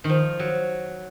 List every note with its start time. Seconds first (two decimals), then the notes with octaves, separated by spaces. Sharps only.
0.04 D#3
0.09 F3
0.39 F#3